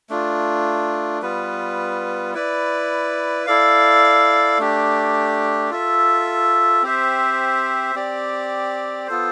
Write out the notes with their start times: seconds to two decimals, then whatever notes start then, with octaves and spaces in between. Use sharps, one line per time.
0.09 A3 D4 F4
1.22 G3 B3 F4 B4
2.34 E4 B4 D5
3.46 E4 A4 D5 F5
4.58 A3 D4 G4
5.70 F4 A4 E5
6.83 C4 G4 C5 E5
7.95 C4 G4 D5
9.07 B3 F4 A4 C5